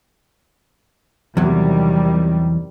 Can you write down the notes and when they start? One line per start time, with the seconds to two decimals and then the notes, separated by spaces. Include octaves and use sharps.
1.37 E2 C3 D#3 F#3 G3